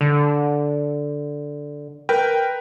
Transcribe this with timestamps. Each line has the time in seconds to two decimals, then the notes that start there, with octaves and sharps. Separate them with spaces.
0.01 D3
2.09 A#4 B4 G5